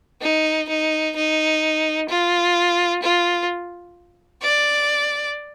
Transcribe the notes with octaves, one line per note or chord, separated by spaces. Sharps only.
D#4
D#4
D#4
F4
F4
D5